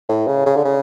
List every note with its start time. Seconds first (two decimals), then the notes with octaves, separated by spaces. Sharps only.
0.09 A2
0.27 C#3
0.46 C#3
0.56 D3
0.65 C#3